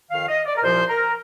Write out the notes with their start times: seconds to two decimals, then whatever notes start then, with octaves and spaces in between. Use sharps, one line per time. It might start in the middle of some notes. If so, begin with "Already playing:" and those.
0.10 F2 D#3 F5
0.29 D#5
0.46 D5
0.57 A#4
0.63 C2 A#2 F3 C5
0.89 A#4